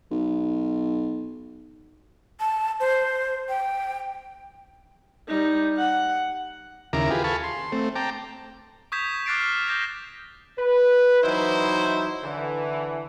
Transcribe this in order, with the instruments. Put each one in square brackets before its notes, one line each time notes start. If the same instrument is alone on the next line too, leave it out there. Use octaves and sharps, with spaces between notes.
[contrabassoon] B1
[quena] A5
C5
G5
[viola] G3 D#4
F#5
[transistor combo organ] D#2 C#3 E4 A#4 A#5 D6
F4 G4 G#4 B4
A4 F5 G#5 A5 B5 C#6
C6
A3 C4
G5 A5 A#5 D6
[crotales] C#6 D#6 G6 G#6 B6 E7
D6 F6 F#6 A6 C7 D7
D6 F6
D6 G6 A#6 B6 E7 F7
[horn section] B4
E3 F#3 D#4 E4 C5
D3 E3